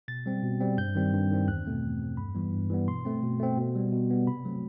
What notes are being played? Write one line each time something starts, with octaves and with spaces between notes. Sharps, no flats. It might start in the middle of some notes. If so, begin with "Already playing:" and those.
B2 A6
G3 C4
B2
G3 C4
G2 G6
D#3 G3 C4
G2
D#3 G3 C4
E2 F#6
B2 A3 C4
E2
B2 A3 C4
G2 B5
E3 G3 B3
G2
E3 G3 B3
B2 C6
A3 C4
B2
A3 C4
B2
G3 B3
B2
G3 B3
C3 B5
F#3 A3 C4